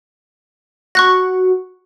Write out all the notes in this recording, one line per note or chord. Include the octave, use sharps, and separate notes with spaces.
F#4 F#5 C#6 F#6 A#6